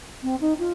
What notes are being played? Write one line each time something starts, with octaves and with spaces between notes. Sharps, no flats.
C4
D#4
F4